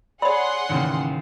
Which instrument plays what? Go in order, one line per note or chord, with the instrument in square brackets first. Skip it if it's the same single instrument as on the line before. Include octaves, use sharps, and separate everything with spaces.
[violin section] G#4 F#5 C6 [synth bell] C#5 D5 [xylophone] B5
[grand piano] A1 D#2 C#3